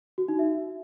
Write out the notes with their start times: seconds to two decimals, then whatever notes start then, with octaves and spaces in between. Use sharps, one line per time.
0.18 F#4
0.28 D#4
0.39 E5